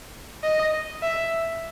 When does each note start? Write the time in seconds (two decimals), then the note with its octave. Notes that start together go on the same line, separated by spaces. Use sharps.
0.44 D#5
1.02 E5